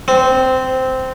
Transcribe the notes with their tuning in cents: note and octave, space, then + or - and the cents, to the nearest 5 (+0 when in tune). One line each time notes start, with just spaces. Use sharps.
C4 -10